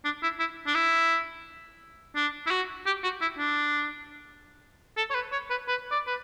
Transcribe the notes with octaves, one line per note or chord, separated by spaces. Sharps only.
D4
E4
E4
D4
E4
D4
E4
F#4
G4
F#4
E4
D4
A4
C#5
B4
C#5
B4
B4
D5
B4